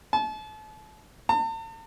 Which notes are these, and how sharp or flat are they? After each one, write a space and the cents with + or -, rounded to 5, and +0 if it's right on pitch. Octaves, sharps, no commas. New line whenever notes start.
A5 -35
A5 +45